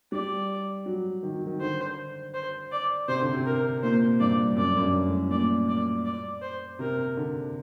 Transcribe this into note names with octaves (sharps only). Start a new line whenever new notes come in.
G3 D5
F#3
D#3
F#3
D#3
D3 C5
C5
D5
C3 C5
D3
C3
A#4
A#2 C5
G2 D5
F#2 D5
F#2
G2
A2
A#2 D5
D5
D5
C5
C3 A#4
D3